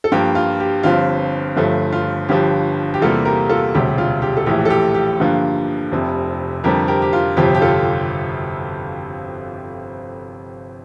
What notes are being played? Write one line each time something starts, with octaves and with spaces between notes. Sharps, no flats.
A4
G2 F3 A#3 G4
F4
G4
G1 G2 F3 C4 F4
G1 G2 F3 A3
F4
G1 G2 F3 G4
G4
E2 C3 G3 A#3 F4 A4
G4 A#4
F4 A4
E1 D2 C3 G3 G4
F4
G4
A4
A#1 A2 E3 G4
A4
G4
G4
G2 D3 F3 A#3
F1 F2 C3
F2 D3 G3 C4 G4 A#4
G4 A#4
G4
F4
G1 F2 C3 F3 G4
G4
F4 A4